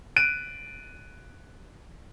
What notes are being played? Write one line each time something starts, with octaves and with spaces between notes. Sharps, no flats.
F#6 D7 D#7